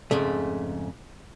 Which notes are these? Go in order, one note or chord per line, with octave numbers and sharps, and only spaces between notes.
F2 G#2 C#3 A3